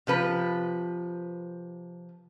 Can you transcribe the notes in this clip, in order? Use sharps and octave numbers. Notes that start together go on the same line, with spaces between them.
C3 F3 B4